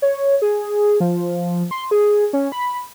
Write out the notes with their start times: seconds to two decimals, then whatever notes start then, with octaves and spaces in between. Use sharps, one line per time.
0.02 C#5
0.42 G#4
1.00 F3
1.71 C6
1.91 G#4
2.33 C#4
2.52 B5